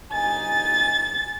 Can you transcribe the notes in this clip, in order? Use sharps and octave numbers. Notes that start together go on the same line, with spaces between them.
G1 D#4 G#5 A6